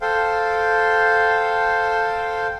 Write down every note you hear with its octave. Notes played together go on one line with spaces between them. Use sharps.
A4 C5 F5 G5